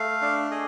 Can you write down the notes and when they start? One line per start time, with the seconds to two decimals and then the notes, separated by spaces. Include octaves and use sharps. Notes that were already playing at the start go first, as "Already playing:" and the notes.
Already playing: A3 F5
0.22 D4
0.51 G#4 D#5